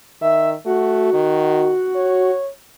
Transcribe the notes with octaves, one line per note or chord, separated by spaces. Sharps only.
D#3 E5
A3 F#4
D#3
C#5